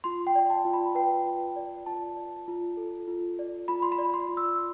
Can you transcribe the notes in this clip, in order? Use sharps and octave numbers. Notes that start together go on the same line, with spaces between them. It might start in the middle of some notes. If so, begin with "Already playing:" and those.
F4 C6
G5
D5
A5
F4
B5
B4 G5
F4
D5
F4 A5
D5
F4
A4
F4
D5
F4 B5
C6
B5
D5
C6
F4
E6